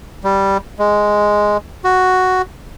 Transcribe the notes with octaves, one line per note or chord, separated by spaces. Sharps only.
G3
G#3
F#4